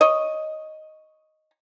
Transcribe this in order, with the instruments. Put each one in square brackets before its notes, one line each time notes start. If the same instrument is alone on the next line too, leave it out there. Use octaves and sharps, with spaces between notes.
[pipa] C#5 D#5